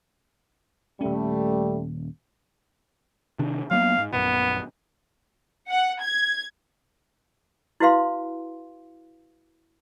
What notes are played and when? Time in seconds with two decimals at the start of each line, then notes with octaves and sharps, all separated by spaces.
1.01 D#1 G3 A3 C#4
3.39 C3 D#3 D4
3.71 F#3 A#3 B3 F5
3.98 G#2
4.13 A#1 F#2 B3
5.69 F#5
6.01 G#6
7.80 E4 F#4 B4 F5 C6